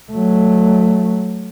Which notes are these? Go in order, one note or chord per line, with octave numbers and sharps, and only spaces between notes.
F#3 A3